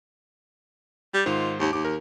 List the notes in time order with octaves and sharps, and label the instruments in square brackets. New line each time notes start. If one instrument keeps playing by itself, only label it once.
[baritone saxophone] G3
[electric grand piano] G#2 D#3 C5 [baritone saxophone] F4
[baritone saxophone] D#2
[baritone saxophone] D#2 [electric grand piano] D6
[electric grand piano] A#4